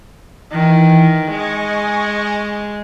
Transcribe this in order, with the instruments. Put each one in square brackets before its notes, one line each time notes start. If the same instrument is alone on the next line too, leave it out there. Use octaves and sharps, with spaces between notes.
[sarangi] D#3 [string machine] E3
[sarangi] G#3 [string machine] D#5 G#5 C#6